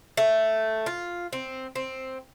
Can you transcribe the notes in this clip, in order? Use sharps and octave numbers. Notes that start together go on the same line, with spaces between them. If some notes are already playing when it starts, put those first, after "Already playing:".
A3
F4
C4
C4